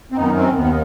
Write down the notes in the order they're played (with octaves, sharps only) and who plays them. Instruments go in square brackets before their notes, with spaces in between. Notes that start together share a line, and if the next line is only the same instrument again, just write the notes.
[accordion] C4
F#2 D#3 B3 D#4
C4
D#2 D#3 B3